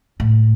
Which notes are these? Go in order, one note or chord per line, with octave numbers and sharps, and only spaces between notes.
A2